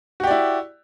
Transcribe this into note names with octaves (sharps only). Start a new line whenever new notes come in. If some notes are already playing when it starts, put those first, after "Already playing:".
E4 F#4 G4 D5